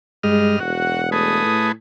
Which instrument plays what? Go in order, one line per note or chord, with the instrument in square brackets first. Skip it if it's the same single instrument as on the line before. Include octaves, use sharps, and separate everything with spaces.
[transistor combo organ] G2 D#5 F6 [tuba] G#3
[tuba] E1 [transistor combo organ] F#4 [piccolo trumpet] F#5
[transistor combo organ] A3 G#4 B4 [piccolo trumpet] D#6
[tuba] A2